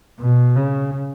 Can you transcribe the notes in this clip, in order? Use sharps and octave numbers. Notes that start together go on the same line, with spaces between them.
B2
C#3